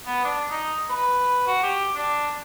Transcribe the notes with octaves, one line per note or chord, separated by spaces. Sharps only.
B3
D4
D#4
B4
F#4
G4
D4